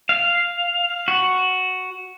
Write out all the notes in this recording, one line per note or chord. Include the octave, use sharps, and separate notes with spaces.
F5
F#4